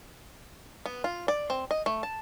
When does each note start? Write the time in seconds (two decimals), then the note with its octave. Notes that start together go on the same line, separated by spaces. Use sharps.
0.86 B3
1.04 F4
1.28 D5
1.50 C4
1.71 D#5
1.86 A3
2.03 A5